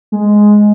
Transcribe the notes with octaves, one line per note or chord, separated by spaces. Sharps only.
G#3